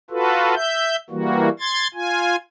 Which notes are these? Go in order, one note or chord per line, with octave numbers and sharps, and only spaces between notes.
F4 F#4 A4 B4
E5 G6
E3 G3 A#3 F#4
C6 G#6 A6
F4 G#5